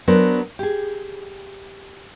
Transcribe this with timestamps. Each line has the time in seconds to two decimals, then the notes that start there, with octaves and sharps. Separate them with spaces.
0.08 F#3 B3 D4 A#4 C5
0.59 G4 G#4